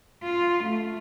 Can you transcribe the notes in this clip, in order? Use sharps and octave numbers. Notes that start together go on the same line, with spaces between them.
F4
A3